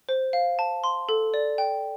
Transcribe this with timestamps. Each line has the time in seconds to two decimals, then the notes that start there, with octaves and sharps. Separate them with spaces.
0.09 C5
0.33 F5
0.59 A5
0.84 C6
1.09 A4
1.34 D5
1.58 G5